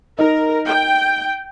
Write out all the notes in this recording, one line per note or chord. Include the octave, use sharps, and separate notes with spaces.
D#4 A#4
G5